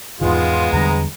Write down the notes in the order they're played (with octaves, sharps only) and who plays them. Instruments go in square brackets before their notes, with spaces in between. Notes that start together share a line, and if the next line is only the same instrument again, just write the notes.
[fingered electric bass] E2 G#2 D#3 [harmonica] G#3 B3 [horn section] F4
[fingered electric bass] E2 D3 G3 [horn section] A#5